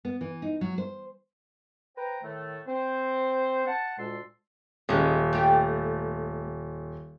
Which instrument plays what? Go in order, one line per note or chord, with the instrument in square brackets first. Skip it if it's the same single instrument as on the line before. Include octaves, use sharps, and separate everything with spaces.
[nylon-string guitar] B3
E3
D#4
F#3
C5
[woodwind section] B4 C5 G5 A#5
A2 D#3 A3
C4 C5
F#5 A5
D2 A#2 G#3 A4 C6
[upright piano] D#1 [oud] G#3 C#4
[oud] A3 G4